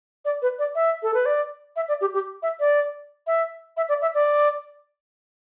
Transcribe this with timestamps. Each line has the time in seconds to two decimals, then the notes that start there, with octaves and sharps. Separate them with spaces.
0.25 D5
0.42 B4
0.59 D5
0.75 E5
1.03 A4
1.14 B4
1.26 D5
1.76 E5
1.88 D5
2.01 G4
2.14 G4
2.43 E5
2.60 D5
3.27 E5
3.77 E5
3.89 D5
4.02 E5
4.14 D5